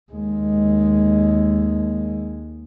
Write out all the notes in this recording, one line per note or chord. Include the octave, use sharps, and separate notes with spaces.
D#2 G#3